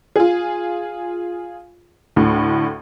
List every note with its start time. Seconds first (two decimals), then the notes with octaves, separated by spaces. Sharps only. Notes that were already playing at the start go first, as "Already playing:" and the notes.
0.16 F4 G#4
2.16 D2 A2